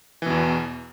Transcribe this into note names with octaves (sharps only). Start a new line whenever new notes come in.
E2 B2 E3